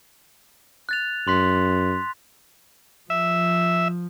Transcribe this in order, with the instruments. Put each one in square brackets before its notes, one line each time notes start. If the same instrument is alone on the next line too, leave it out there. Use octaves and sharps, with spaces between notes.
[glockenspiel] F#6 A6 F7
[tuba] F#2 [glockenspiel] C6 F#6 B6
[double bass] F3 [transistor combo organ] E5